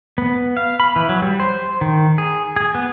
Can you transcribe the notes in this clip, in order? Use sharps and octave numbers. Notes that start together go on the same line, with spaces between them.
B3
F5
B5
E3
F#3
G3
C5
D#3
G#4
G#4
B3